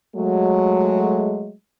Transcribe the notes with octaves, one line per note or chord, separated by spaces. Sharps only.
F#3 G#3 A3